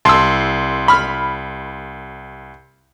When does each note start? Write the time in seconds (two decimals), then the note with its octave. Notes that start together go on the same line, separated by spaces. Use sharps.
0.05 C2 A5 C6 E6
0.88 B5 F6